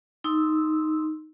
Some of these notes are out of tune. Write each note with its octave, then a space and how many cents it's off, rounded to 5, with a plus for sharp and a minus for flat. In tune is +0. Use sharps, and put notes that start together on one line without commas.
D#4 +0 C6 +0 E6 -10